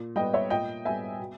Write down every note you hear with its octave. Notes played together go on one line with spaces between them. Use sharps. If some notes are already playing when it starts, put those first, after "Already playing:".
Already playing: A#2
G3 B3 D#5 G5
C#5 E5
A#2 D#5 G5
G3 B3 E5 G#5
B2